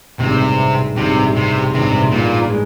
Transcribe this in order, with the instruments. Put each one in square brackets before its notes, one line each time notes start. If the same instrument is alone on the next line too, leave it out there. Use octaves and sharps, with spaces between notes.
[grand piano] A1 G2 D#3 G#3 [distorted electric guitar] C3
[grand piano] A1 G2 D#3 G#3 [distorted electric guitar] C3
[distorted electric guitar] C3
[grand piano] A1 G2 D#3 G#3 [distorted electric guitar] C3
[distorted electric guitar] A#2
[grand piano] G#3